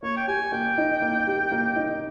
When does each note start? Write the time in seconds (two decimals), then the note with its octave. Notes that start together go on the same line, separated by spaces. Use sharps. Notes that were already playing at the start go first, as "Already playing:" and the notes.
0.03 A#3 C#5
0.17 G5
0.28 G4 G#5
0.52 A#3 G5
0.78 D#4
1.02 A#3
1.27 G4
1.52 A#3
1.76 D#4